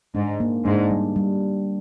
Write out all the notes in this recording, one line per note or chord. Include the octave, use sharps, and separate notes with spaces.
G#2 D4
A#3
G#2 D4
G3
G3